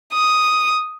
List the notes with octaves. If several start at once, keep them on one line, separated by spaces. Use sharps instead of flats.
D#6